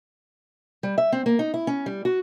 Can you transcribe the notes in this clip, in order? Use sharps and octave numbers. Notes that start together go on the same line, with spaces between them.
G3
E5
C4
A#3
D#4
E4
C#4
G3
F#4